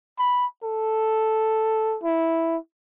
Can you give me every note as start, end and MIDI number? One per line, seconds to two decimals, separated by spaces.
0.19 0.46 83
0.64 1.98 69
2.04 2.57 64